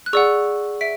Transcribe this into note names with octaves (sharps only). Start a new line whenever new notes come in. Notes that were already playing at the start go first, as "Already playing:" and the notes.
F#6
G#4 D5 F#5 C#6 E6
E5 B6 D7